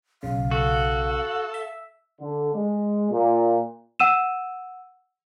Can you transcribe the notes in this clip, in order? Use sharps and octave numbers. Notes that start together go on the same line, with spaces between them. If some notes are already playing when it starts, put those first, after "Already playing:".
B1 C#3 F5
F#4 A4
E5
D3
G#3
A#2
F#5 E6 D#7 E7